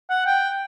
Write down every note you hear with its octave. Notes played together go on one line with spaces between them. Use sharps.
F#5
G5